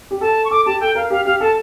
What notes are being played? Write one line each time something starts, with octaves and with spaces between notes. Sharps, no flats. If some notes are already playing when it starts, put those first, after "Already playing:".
G4
A4 A5
C#6
A4 D6
G4 A5
A4 G5
A#4 F5
G4 F5
G4 F5
A4 A5